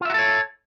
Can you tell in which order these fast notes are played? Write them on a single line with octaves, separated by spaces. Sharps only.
F4 E5 F#4 A4 C#5